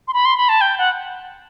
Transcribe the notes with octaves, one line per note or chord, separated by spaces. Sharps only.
C6
B5
C6
B5
A5
G5
F#5